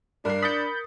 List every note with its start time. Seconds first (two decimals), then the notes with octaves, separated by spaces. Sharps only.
0.25 G2 D4 A#4 C7
0.42 B5 D#6 G6 A6 C#7